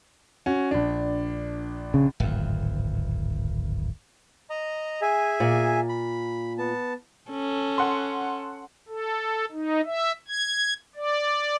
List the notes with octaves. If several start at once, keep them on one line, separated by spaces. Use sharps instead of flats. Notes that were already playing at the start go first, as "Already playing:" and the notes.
C#4 F#4
A#1 D4
C#3
D1 G#1 F2
D#5 A#5
G#4 E5 G#5
A#2
B5
B3 A5
C#4 A4
F#5 C6
A4
D#4
E5
G#6
D5